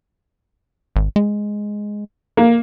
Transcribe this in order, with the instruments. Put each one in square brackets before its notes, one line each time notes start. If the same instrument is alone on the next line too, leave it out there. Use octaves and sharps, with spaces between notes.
[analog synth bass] G#1
G#3
[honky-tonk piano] A#3